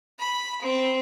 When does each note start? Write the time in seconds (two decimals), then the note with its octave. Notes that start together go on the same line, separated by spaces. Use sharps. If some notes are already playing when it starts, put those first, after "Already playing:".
0.20 B5
0.62 C4